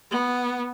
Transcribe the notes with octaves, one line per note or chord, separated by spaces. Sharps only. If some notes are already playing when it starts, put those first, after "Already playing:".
B3